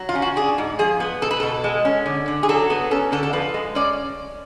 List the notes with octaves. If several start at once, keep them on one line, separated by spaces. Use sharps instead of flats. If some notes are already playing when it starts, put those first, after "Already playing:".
Already playing: F#3
F4
C#4
F#4
D4 G#4
G#2
F3 G#4
B3
B2 A4
B4
B2 A4
G#3
C#4
D3
D3
G#4
F#3 A4
B3
C#4 A4
D3 A4
A4
F3 B4
G#3
C#4 D5